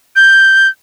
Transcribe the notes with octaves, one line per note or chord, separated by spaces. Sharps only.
G6